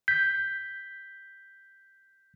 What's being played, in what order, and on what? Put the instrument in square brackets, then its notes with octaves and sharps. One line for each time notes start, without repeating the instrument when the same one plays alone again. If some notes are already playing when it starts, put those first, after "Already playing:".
[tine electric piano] G6 B6